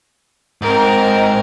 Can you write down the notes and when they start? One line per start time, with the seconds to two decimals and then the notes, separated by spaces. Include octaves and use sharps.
0.62 G#2 C4 A#4